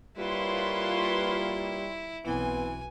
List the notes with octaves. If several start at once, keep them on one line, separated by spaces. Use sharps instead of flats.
G3 A#3 E4 F4 B4 C#5 C6
B1 E3 B3 C4 G#5